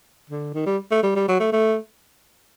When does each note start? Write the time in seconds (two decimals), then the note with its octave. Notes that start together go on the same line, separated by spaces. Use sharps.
0.30 D3
0.54 D#3
0.66 G3
0.91 A3
1.03 G3
1.16 G3
1.28 F#3
1.40 A3
1.53 A3